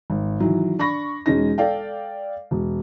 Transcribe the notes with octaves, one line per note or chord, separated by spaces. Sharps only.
G#1
D#3 E3 F#3
D4 B5 C#6 A#6
E1 G#3 C#4 D#4 A#6
A4 D5 F5 G5
E1